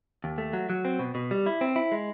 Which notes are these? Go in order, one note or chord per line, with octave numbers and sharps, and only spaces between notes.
D#2
A3
F#3
F#3
C4
B2
B2
G3
E4
C4
E4
G#3